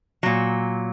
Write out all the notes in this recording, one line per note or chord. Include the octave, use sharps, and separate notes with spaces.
A#2 F#3